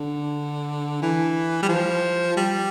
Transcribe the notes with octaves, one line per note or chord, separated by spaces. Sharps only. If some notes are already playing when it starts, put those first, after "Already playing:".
Already playing: D3
E3
G3
F3
G3